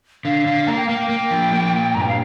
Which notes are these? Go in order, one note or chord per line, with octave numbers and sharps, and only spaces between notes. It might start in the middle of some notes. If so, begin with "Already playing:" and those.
D3 F5
D3
A#3 A#5
G5
A#3 F5
G5
A#3
F3
A#3
A#2
G2 A#5
G5
F5